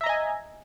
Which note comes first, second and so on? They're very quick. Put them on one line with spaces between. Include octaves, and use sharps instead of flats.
E5 A#5 D#5 G#5